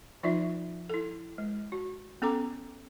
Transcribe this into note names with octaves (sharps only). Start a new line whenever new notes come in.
F3 D#4 F4 D5 E5
E4 A4
G#3
F#4
B3 C#4 A4 A#5 D6